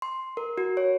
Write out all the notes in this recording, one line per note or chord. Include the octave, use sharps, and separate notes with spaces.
C6
A#4
F#4
C#5